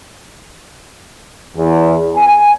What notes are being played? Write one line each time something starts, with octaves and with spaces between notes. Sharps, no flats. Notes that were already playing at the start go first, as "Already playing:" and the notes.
E2
G#5